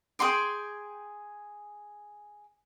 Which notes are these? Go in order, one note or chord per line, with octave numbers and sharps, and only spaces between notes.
G#4 G5 C6 D6